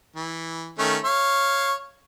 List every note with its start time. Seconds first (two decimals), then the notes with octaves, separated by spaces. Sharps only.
0.16 E3
0.79 D#3 A3 C#4
1.04 C#5 F5